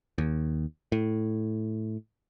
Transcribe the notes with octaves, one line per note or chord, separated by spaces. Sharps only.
D#2
A2